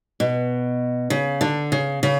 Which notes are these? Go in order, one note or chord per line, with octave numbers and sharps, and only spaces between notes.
B2
C#3
D3
C#3
C#3